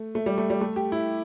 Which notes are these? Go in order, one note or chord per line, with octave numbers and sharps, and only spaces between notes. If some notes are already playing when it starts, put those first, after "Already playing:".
Already playing: A3
A3
G3
A3
G3
A3
G4
E4